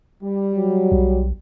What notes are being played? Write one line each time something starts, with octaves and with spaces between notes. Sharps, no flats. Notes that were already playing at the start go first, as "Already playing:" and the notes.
G3
F#3
B1